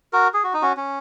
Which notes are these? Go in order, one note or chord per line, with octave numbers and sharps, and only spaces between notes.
F#4 A#4
G#4
F#4
D#4
C#4 F#4
C#4